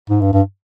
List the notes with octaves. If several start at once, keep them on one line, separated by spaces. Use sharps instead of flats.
G#2
G2
G2